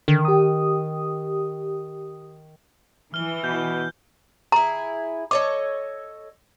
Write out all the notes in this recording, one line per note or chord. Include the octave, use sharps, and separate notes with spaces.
D3 D#3
G4 D#6
E3 F6 G7
B2 G6
E4 G#4 A#5
A4 C#5 D#5 D6